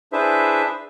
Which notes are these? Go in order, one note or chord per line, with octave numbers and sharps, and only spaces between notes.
D4 E4 G#4 B4 C5 E5